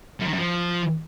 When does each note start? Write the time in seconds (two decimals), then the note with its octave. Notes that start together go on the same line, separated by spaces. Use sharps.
0.20 F#2
0.27 D#3
0.33 F#2
0.39 F3